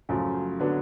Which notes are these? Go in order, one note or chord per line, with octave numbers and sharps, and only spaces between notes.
F#2 C#3 F3 A3
D3 F#3 B3 D4